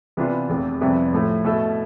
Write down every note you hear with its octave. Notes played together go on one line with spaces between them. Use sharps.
C3 E3 B3 D4 F4
F1 E2 C3
F2 C3 G3 B3 E4
A2 F3 A3 E4
B2 A3 E4 A4